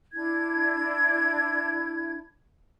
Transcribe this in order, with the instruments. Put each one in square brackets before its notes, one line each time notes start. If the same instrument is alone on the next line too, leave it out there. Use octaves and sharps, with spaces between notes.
[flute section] D4 E4 G#6